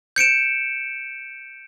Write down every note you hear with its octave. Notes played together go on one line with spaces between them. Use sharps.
G6 C#7 D7 E7